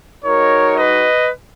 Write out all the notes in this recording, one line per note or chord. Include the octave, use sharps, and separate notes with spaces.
G#3 D#4 F#4 A#4 C#5
B4 D#5